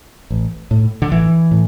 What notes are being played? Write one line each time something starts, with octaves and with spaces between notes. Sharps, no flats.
A1
A2
D3
A1 E3
A2